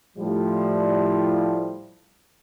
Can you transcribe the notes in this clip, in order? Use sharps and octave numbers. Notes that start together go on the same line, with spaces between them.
A2 F3 G3